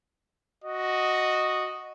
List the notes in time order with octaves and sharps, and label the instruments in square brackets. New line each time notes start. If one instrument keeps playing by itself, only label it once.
[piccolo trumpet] F#4 [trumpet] D#5